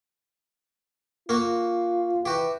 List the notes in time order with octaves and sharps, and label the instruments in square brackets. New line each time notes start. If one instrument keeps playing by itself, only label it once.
[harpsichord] A#3 F#4 [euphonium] F4
[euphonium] E3 [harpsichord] F#4 G4